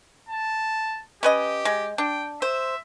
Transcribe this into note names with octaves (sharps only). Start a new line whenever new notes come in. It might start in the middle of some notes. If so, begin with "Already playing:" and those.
A5
C#4 G4 B4 D#5
G#3
D4 G5
C5 E5